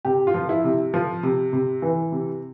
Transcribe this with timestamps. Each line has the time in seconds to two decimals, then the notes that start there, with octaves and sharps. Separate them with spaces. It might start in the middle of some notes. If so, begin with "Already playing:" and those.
0.05 C3 G4
0.27 F4
0.34 F3
0.49 E4
0.64 C3
0.94 F3
1.23 C3
1.53 C3
1.82 E3
2.12 C3